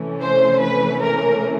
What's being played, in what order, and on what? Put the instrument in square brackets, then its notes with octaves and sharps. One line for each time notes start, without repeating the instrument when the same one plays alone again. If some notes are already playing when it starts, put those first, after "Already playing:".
Already playing: [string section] C3 E3 A3 C#4
C5
B4
A#4